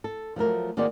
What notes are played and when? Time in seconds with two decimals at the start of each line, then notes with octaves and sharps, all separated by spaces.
0.04 A4
0.36 F3 F#3 A3 A#4
0.77 D#3 A#3 F#4 G#4 C5 D5